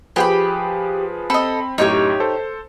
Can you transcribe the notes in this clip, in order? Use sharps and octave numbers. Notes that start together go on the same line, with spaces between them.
F3 G4 G#4 B4 G5 B5
C4 A4 D#5 B5
F#2 A2 D#4 G4 C#5
A4 C5